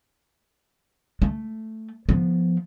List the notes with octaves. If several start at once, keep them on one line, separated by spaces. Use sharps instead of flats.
A3
F3 B3